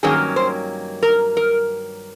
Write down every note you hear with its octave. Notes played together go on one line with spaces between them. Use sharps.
G2 D#3 F#3 A#3 C#4 G#4
C5
A#4
A#4